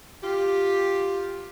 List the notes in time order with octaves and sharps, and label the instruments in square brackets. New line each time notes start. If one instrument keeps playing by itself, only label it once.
[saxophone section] F4 G4